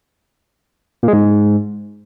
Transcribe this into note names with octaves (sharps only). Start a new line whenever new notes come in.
A#2
G#3
G#2